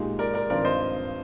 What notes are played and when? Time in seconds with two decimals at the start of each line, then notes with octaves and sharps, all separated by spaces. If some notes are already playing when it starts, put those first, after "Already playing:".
Already playing: A#2 G#3 D#4 G4
0.19 A#4 D5
0.34 A#4 D5
0.49 G#1 G2 F3 C4 A#4 D5
0.65 C5 D#5